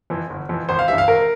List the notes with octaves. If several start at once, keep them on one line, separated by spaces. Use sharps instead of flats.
F2 E3
G1
F2 E3
G#1 C5
F5
G2 E3 G3 E5
F5
G#1 A#4